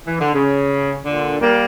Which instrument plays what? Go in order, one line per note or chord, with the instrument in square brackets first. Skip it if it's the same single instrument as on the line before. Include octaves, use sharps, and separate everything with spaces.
[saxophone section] E3
D3
C#3
A#2 D3
G3 A#3